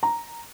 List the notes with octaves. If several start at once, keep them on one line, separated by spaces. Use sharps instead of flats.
A#5